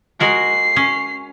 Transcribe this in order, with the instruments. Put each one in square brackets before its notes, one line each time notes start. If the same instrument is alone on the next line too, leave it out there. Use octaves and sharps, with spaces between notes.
[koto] G#3 F#4 A#4 [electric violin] C7
[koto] C#4